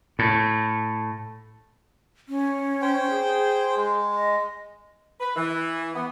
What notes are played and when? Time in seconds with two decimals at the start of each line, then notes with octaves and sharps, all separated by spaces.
0.19 A2
2.29 C#4
2.82 C5 G5
3.10 G#4
3.76 G#3
4.12 D#5
5.20 B4
5.36 E3
5.95 B3